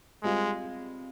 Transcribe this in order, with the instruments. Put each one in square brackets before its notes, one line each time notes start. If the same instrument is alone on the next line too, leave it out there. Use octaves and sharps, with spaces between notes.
[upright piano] G3 C4 F4 [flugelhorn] G#3